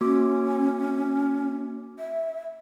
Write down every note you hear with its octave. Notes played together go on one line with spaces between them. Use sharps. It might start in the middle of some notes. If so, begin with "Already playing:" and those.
A#3 C#4 F#4 D6
E5